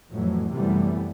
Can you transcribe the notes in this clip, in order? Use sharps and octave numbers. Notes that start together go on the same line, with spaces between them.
F2 A2 E3 F#3
F#2 C3 E3 G3 A3 B3